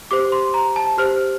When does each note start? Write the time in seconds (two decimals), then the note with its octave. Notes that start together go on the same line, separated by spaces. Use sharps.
0.11 G4 C5 D6
0.32 C6
0.54 A#5
0.76 A5
0.98 G4 C5 F6